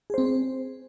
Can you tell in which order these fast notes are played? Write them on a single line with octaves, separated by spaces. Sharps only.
G#4 C5 C4